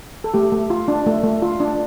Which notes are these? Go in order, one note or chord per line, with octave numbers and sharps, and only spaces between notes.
A4
A3 G4
A3
F4
D4
A3
A3
F4
D4